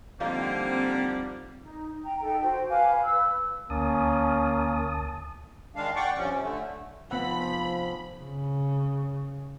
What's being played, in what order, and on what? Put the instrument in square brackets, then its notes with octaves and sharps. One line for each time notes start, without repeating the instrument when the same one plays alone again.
[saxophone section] D3 G3 [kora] F3 D#4 F4 [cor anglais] A#3 [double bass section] C4
[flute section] D#4
G5 A#5
D#4 A4 G5
F#4 C5 G5
B4 F5 G#5 D6
B4 E6
[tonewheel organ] D2 A5 D#6 [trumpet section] A#3 C#4
[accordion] D#3 G#3 D4 F5
D5 F#5 G5 C#6 D6
G2 C3 F3 C#4
C3
D3 A3
[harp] F1 E6 [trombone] F3 [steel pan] B3 F#5 [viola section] B5
[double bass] C#3